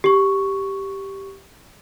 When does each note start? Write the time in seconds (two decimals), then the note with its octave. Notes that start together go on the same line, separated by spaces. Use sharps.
0.04 G4 C#6